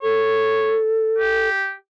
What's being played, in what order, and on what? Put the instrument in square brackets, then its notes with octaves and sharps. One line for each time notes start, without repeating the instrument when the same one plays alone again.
[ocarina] A4 [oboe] C#5
[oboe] G4